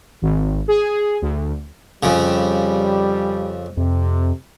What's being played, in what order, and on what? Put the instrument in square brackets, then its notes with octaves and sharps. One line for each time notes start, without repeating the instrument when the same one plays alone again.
[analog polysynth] G#1
G#4
D2
[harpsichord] F2 C#3 [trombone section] G3
[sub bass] F2 [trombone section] C3